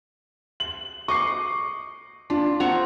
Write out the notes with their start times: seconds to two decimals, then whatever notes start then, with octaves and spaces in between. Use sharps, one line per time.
0.60 F#7
1.08 D#5 C#6 D6 C7
2.30 D4 F4
2.60 C4 F#5 A#5 C#6